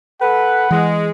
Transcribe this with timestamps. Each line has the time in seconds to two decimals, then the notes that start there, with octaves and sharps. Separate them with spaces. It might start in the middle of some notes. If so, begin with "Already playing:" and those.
0.21 A4 B4 F#5
0.71 E3 G#3